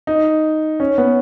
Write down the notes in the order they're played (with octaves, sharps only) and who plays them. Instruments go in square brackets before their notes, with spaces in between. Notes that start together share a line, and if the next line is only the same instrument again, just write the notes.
[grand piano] D#4
C#4
B3